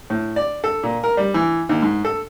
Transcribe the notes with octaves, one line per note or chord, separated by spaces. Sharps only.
A2
D5
A4
A#2
A#4
G3
E3
D#2
G#2
A4